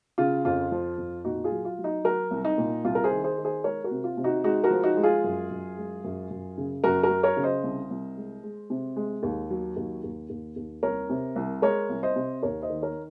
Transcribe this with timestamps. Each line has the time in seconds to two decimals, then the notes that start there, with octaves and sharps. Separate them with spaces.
0.18 C#3 F4
0.45 F2 F4
0.71 F3
0.98 F2
1.24 A#2 D#4 F#4
1.44 F4 G#4
1.51 F#3
1.65 F4
1.79 F#3
1.84 D#4 F#4
2.04 F#3 F#4 A#4
2.31 C2
2.45 D#4
2.58 A#2
2.84 C2 F4
2.95 A#4
3.04 G#4 C5
3.11 D#3
3.24 G#4 C5
3.38 D#3
3.45 G#4 C5
3.64 G#3 A#4 C#5
3.84 F#4 A#4
3.91 C3
4.04 F4
4.17 C3
4.24 D#4 F#4
4.44 G#3 D#4 F#4
4.64 F#4 A#4
4.70 F3
4.83 D#4 F#4
4.97 G#3
5.03 F4 G#4
5.24 F#2
5.50 F#2
5.77 G#3
6.04 F#2
6.30 F#2
6.58 C#3
6.84 F#2 F#4 A#4
7.03 F#4 A#4
7.10 F#3
7.23 A#4 C#5
7.37 C#3
7.43 C5 D#5
7.64 C2
7.90 C2
8.17 G#3
8.43 G#3
8.70 C3
8.96 G#3
9.23 D#2
9.50 F#3
9.76 D#2
10.04 D#2
10.30 D#2
10.56 D#2
10.83 C2 A#4 C#5
11.10 C3
11.36 C2
11.62 G#3 A#4 C#5
11.89 C2
12.03 C5 D#5
12.16 C3
12.43 D#2 A#4 C#5
12.62 C5 D#5
12.70 D#3
12.82 A#4 C#5